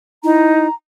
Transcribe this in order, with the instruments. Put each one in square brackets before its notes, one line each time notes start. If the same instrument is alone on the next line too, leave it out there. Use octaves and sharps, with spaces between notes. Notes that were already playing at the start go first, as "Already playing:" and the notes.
[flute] D#4 [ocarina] E4 [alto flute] A#5